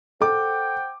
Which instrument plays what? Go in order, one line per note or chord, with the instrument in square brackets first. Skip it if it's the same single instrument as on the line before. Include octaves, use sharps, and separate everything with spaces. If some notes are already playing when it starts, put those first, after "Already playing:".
[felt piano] A4 D6 [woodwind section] C5 F#5 G5